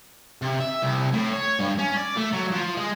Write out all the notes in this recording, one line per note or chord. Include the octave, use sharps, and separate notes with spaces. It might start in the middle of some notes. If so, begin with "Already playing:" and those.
C3
E5
C2
A2
C#5
G2
C#4
D5
A3
F#3
F3
G#3